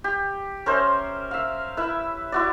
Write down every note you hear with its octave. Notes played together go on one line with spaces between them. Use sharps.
G4
C#4 A#4 C5 E5
E5 F5
E4 B4 E5
E4 F#4 D5